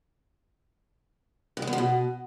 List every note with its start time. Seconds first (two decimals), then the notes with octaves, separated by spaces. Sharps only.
1.57 G2
1.62 G#3
1.67 E2
1.73 F3
1.78 B2